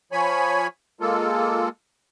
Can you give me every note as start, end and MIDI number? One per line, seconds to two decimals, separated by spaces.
0.12 0.67 53
0.12 0.67 73
0.12 0.67 80
0.12 0.67 83
1.01 1.69 56
1.01 1.69 58
1.01 1.69 65
1.01 1.69 69